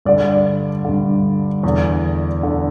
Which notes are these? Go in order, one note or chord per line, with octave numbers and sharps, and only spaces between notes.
G2 D3 D5
G2 D3
E2 D3
D3